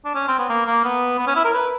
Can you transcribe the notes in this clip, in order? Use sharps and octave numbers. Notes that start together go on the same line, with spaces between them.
D4
C#4
C4
B3
A#3
A#3
B3
B3
C#4
E4
A#4
B4